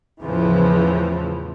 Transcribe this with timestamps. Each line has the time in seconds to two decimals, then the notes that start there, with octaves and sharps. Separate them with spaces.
0.21 E2 A2 C#3 E3 F3